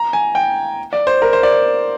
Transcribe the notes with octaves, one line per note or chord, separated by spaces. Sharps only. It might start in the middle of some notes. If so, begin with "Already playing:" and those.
Already playing: A#5
G#5
G5
D5
C5
A#4
C5
D5